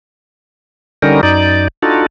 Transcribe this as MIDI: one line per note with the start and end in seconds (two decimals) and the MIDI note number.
1.02 1.21 50
1.02 1.21 55
1.02 1.21 61
1.02 1.21 63
1.02 1.21 70
1.23 1.68 42
1.23 1.68 63
1.23 1.68 74
1.82 2.06 62
1.82 2.06 63
1.82 2.06 65
1.82 2.06 66
1.82 2.06 69